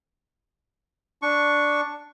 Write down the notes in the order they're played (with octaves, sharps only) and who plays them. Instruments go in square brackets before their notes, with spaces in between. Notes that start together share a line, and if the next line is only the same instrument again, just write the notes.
[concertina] D4 C#6